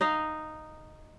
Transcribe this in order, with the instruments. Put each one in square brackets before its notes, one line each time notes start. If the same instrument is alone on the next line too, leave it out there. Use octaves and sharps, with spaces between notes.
[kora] D#4 D#5 F5